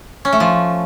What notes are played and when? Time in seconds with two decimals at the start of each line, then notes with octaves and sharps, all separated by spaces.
0.25 C#4
0.33 A3
0.40 F3